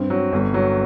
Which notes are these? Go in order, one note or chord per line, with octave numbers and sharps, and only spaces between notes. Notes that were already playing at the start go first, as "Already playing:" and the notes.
Already playing: G2 C4
F#3
G1
F#3